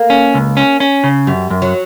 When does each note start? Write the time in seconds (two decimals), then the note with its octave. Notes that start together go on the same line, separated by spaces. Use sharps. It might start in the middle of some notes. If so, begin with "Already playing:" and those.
Already playing: A#3
0.10 C#4
0.34 C#2
0.57 C#4
0.80 C#4
1.04 C#3
1.27 F#2 G3
1.50 F#2
1.62 F#3